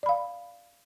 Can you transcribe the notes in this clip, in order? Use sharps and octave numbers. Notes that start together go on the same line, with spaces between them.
D5 F5 B5